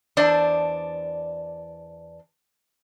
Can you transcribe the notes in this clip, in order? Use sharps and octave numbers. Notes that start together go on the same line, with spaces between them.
E2 D4 C5 D5 A5